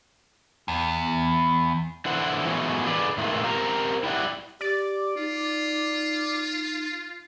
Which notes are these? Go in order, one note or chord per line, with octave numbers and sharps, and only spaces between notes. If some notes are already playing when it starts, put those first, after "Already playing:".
E2
D3 E3 E4 C5 F#5
E3 F#3 G#3 A3 B3 C#5
D3 G#4 B4 D5
A2 D#3 E3 G#3 A3 F4
C4 G4 A#4 A#5
E4 G4 D5 E5 F#5
G4 D5
D#4 F4